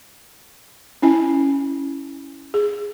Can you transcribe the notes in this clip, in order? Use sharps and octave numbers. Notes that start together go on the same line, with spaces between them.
C#4 E4 G#5
G#4